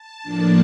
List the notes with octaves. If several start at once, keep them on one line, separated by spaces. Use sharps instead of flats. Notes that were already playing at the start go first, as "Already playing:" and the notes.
Already playing: A5
A2 F3 A#3 D4